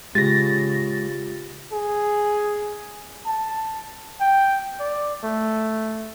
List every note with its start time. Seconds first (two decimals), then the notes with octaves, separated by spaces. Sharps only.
0.15 C#3 G#3 F4 G4 A6 A#6
1.72 G#4
3.26 A5
4.20 G5
4.80 D5
5.24 A3